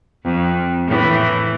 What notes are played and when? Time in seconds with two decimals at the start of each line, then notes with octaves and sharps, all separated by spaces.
0.24 F2
0.87 A2 E3